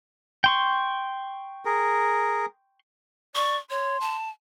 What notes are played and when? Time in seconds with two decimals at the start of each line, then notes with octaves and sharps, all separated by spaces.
0.44 G5 C6 C#6
1.65 G#4 A#4
3.35 D5 C#6
3.70 C#5 C6
4.01 A5